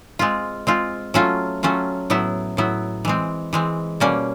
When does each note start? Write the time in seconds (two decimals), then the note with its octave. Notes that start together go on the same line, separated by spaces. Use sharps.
0.19 G#3 C4 F4
0.67 G#3 C4 F4
1.14 F#3 A3 C#4 F4
1.63 F#3 A3 C#4 F4
2.10 A2 F#3 B3 E4
2.57 A2 F#3 B3 E4
3.05 E3 G#3 C4
3.53 E3 G#3 C4
4.00 B2 G3 A#3 C#4